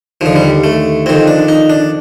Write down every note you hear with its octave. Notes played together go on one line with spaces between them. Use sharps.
D#2 D3 F3
G3
A3
F2 D#3 C4
D4
D#4
D4